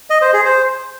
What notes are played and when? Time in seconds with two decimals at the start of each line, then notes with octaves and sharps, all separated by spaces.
0.10 D#5
0.22 C5
0.33 G#4
0.45 C5